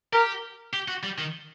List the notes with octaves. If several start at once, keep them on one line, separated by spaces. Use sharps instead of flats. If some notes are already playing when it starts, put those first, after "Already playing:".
G4 A#4
G4
F#4
G3
D#3